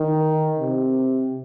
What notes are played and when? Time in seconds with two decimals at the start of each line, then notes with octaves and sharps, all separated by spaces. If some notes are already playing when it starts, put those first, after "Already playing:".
Already playing: D#3
0.59 C3